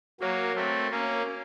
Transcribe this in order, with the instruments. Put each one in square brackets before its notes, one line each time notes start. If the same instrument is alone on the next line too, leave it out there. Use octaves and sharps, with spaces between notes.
[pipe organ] F#3 A#3 [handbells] F#4 A#4 C#5
[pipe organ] A3 C4
A#3 C#4